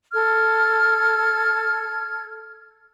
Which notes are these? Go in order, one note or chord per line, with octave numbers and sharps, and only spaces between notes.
A4 F6 G#6